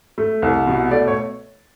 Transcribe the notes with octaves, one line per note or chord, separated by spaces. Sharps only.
A3
C2
B2
A3 D5
C#5